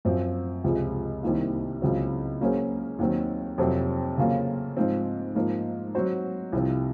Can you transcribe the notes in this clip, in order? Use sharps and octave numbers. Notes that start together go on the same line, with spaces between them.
F#2 F3 C4
C#2 C3 F3 G#3
C2 C3 D#3 A#3
C#2 C#3 F#3 C4 F#4
F#3 A#3 C#4 G#4 C5
D#2 D#3 F#3 C4
F2 C3 F#3 C4
C#3 F#3 A#3 C#4 F4
G#2 F3 C4
G#2 F3 A#3
F#3 C4 F#4 C5
C2 C3 F3 C4